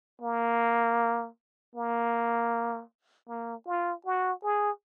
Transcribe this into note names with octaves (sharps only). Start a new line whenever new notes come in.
A#3
A#3
A#3
F4
F#4
G#4